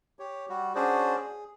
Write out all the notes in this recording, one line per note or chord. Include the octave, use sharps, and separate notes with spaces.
G4 C#5
G3 F#4
C#4 D4 F#4 G#4 C5 D5
G#4